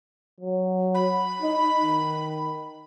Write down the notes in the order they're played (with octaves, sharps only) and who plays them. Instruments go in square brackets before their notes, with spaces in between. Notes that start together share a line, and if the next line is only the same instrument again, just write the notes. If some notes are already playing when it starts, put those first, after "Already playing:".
[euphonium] F#3
[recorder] B5
[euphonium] D#4
D#3